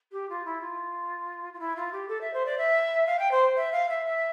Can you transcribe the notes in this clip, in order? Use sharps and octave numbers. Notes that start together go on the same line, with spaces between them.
G4
F4
E4
F4
F4
E4
F4
G4
A4
E5
C5
D5
E5
F5
G5
C5
E5
F5
E5
E5